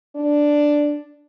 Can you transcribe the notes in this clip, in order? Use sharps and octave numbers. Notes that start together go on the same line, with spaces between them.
D4